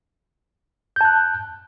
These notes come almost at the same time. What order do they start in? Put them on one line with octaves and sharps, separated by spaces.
G6 A5 F#6